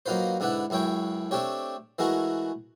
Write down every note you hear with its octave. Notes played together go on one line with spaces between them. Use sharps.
F#3 A#3 D#4 F4 B4 C5
G#2 D3 D4 E4 B4 F#5
C#2 F#2 E4 C#5 G5
A3 C4 D4 G4 C#5
E3 G#3 A3 E4 F#4 A#4